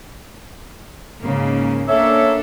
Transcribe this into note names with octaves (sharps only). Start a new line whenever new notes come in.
G#2 C#3 A#3
A#3 C#4 D4 A4 C#5 E5